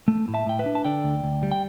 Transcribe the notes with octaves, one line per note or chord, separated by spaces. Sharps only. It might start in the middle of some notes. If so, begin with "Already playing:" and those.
A3
A2
E5 A5
A2 G5
B4 E5
D4
A5
D3 D5 G5
D2
D2
G3
G5